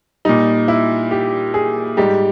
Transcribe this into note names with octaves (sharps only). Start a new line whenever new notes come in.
A#2 G3 D#4
E4
G4
G#4
G#2 G3 G4